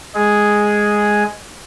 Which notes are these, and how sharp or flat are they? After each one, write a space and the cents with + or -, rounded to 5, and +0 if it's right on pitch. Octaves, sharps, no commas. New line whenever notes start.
G#3 +0 G#4 +0